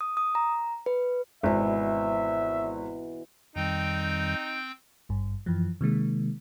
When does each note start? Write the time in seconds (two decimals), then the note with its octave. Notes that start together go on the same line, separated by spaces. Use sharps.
0.01 D#6
0.17 D#6
0.35 A#5
0.86 B4
1.43 G#1 B2 E3 D5 E5
3.56 F2 D#3 G3 C4 D#4 G5 G6
5.09 G#1 G2
5.46 F#2 E3 F3
5.81 C3 D#3 G#3 A#3